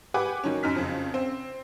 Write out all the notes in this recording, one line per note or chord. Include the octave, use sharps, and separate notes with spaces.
G4 B4 F#5 G#5 D6
D#3 F#3 C#4
F#2 D#4 F6 B6
F2 C#3
C4